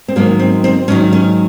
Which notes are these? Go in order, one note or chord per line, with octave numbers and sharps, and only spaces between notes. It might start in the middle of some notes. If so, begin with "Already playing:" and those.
C4
G#2 D#3 F#3 A#3
C4
C4
G#2 D#3 F#3 C#4
C#4